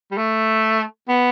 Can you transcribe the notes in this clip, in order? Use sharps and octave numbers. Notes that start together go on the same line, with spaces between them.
G3
A3
B3